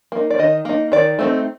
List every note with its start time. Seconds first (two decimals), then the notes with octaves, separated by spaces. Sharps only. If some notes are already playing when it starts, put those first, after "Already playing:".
0.12 A#3 D#4
0.30 D5
0.39 D#3 D#5
0.65 A#3 D#4
0.92 D#3 D5
1.19 A3 C4 D#4